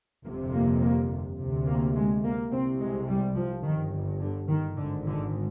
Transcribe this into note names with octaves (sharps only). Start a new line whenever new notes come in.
G1 F2 C3 A#3
A#3
A#3
D2 C3
A#3
G#3
A#3
C2 C3 C4
G#3
G3
F3
G1 G2 D#3
D3
D#3
G#1 G#2 D3
D3